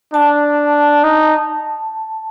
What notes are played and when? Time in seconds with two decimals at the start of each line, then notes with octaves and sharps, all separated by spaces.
0.14 D4 A5
1.04 D#4